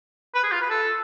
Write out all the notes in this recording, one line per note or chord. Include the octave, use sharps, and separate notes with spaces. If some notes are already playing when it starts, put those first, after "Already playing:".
B4
G#4
F4
B4
A4